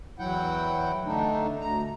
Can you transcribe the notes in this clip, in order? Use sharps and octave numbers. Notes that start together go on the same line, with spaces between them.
E2 F#3 E4 F#5 G5
D3 A3 D4 D#4
D2 A#5